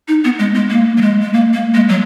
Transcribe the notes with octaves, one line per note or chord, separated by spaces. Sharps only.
D#4
B3
G#3
G#3
A#3
F#3
G#3
G#3
A#3
A#3
G#3
F#3